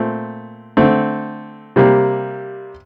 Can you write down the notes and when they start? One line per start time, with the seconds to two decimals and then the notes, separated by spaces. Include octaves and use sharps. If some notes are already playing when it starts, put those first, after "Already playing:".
Already playing: A#2 A3 C4
0.77 D3 A3 C4
1.76 C3 G3 A#3